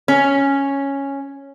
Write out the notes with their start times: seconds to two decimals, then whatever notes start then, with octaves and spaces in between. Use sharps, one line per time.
0.08 C#4